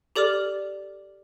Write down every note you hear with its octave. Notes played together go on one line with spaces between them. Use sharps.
G4 A4 D5 D6 F6